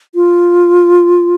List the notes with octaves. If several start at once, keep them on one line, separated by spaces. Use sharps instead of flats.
F4